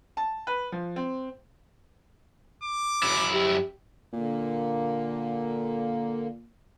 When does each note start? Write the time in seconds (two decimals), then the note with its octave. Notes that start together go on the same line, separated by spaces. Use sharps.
0.17 A5
0.47 B4
0.72 F3
0.96 C4
2.64 D6
3.03 F#2 E4
3.33 G4
4.13 A#2 D3 A#3